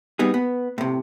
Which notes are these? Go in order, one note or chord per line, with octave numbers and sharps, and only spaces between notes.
G3 B3 D#4 G#4
B3
A2 C3